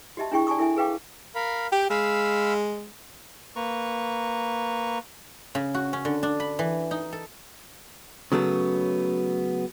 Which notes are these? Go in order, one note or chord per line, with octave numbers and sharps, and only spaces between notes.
F#4 G4 D#5 E5 A5
D4 E4 G#4 G5 C#6
D5 G#5 A5 C#6 D#6
E4 A4 E5 G#5
G#4 B4 F5 G5 D6
A#4 F5 B5
G4 G5
G#3 F5 B5 E6
A#3 B4 A#5 C#6
C#3
F#4
C#4
D3
D4
B5
E3
D#4
A4
C#3 F#3 A3 B3